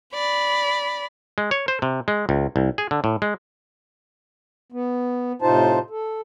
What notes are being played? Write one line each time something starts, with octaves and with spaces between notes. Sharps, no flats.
D5 B5
G#3
C#5
C5
C3
G#3
C#2
C2
G#4
D3
A2
G#3
B3
A2 C3 D#4 F4 C5 A5
A4